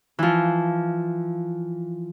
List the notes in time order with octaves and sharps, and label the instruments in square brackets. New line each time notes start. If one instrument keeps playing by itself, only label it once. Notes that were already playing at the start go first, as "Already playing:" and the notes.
[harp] E3 F3